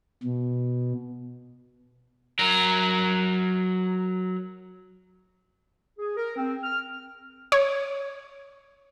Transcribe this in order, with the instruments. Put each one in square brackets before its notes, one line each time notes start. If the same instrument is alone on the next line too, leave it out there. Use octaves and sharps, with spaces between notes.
[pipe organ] B2
[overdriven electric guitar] F#3 A#4
[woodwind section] G#4
A#4
C4
F6
[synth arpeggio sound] C#5